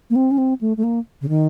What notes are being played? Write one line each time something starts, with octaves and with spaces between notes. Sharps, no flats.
A#3
C4
C#4
C4
A3
A3
A#3
C#3
D#3